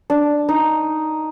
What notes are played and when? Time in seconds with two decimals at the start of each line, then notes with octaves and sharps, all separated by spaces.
0.10 D4
0.49 D#4